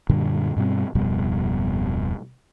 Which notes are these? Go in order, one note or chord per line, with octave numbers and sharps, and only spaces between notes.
F#2 A#2 D3 G3
G2 B2 G3 C4
D1 F2 B2 G3